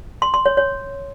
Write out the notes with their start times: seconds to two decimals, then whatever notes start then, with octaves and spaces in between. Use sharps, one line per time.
0.22 C6
0.34 C6
0.46 C#5
0.57 C#5